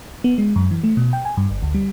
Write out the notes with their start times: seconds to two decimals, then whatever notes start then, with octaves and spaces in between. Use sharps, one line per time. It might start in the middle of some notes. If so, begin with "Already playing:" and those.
0.24 B3
0.38 G#3
0.56 F#2
0.71 E3
0.84 A3
0.97 B2
1.13 G5
1.25 G#5
1.37 G2
1.51 G1
1.62 D2
1.74 G3